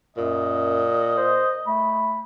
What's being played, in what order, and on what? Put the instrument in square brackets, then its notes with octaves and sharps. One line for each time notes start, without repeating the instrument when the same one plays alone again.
[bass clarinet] F#2 [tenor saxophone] A#2 [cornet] D#5
[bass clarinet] C5
[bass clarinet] A3 [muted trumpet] B5